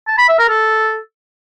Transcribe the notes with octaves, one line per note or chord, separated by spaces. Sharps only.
A5
B5
E5
A#4
A4